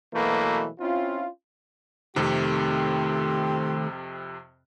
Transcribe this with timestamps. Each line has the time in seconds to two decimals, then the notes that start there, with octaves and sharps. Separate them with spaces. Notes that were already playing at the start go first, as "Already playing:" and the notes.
0.14 B2 E3 F#3 A3 A#3
0.80 C4 C#4 E4 F4
2.16 F2 C3 D#3 A3 C4 G4